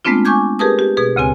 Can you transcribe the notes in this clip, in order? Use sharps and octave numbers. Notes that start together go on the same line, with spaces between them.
G#3 A3 B3 C4 D4 F4
G#5 C#6 D6 G6 G#6
G4 G#4 A#4 B4 A5 D#6
G4
B2 G#4 B4
D2 C#3 C4 G#5